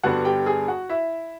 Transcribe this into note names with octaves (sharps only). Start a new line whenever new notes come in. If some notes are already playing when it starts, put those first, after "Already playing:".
G2 D3 G3 B3 D4 F#4 F#5
G4 G5
G#4 G#5
F#4 F#5
E4 E5